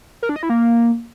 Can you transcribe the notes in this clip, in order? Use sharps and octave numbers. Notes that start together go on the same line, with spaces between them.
A#4
D4
D#5
E4
A#3